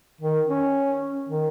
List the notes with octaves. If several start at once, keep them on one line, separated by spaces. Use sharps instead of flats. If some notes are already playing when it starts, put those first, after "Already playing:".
D#3
C#4
D#3